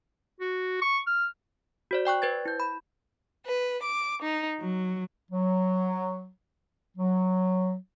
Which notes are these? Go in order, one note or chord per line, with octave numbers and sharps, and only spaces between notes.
F#4
C#6
F6
F#4 C5 D5
D5 G5 C#6 F#6
B4 C5 G#6 A6
E4 G6
B5
B4
D6
D#4
F#3
F#3
F#3